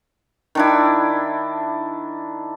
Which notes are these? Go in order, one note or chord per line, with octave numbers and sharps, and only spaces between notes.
D#3 D4 E4